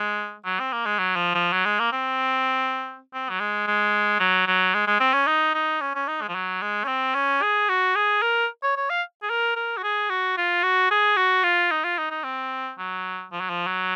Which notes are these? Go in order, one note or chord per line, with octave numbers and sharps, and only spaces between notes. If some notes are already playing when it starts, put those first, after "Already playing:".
Already playing: G#3
F#3
C4
A#3
G#3
F#3
F3
F3
F#3
G#3
A#3
C4
C4
F#3
G#3
G#3
F#3
F#3
G#3
G#3
C4
C#4
D#4
D#4
C#4
C#4
D#4
G#3
F3
F#3
G#3
C#4
C4
C#4
G#4
F#4
G#4
A#4
C#5
C#5
F5
G#4
A#4
A#4
F#4
G#4
F#4
F4
F#4
G#4
F#4
F4
D#4
F4
D#4
D#4
C4
F#3
F3
F#3
F3
F#3